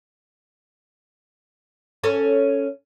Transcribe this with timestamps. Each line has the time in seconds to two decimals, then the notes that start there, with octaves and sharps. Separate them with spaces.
2.04 C#4 A4 C#5